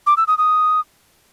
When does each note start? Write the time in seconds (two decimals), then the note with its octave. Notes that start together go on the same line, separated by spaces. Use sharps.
0.07 D6
0.17 E6
0.27 D#6
0.38 D#6